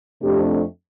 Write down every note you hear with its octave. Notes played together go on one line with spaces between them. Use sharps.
F2 C3 A3 D4 G4